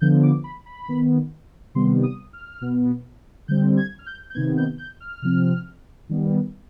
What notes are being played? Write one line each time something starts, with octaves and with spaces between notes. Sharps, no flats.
D3 F3 B3 G6
D6
B5
B5
D#3 B3
C3 D#3 G3 B3 C6
D#6
F6
B2 B3
D3 G3 C4 G6
G#6
F6
G6
G6
C3 D#3 B3 G#6
G6
G6
F6
C3 F3 C4
D#3 G3 B3